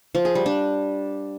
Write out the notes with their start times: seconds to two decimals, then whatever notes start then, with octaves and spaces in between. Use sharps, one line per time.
0.15 F3
0.25 G#4
0.35 G3
0.46 D4